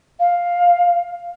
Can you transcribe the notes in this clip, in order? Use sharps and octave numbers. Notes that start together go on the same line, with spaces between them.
F5